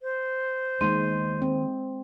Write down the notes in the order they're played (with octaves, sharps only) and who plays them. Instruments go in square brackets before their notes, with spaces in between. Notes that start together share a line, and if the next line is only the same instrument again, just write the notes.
[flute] C5
[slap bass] D#3 A#3 B3 [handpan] G#3 [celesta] D#4 C6 D#7
[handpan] C4